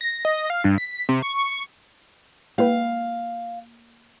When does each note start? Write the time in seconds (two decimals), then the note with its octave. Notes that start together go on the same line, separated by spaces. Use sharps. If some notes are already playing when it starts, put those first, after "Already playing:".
0.01 A#6
0.25 D#5
0.50 F5
0.64 G2
0.78 B6
1.09 C3
1.22 C#6
2.58 G#3 A#3 E4 B4 F5